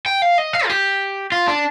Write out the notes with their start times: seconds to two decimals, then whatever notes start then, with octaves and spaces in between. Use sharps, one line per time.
0.06 G5
0.22 F5
0.38 D#5
0.53 F5
0.65 F4
0.70 G4
1.32 F4
1.48 D4